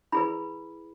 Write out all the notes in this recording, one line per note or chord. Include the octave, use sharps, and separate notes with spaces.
E4 G#4 B4 B5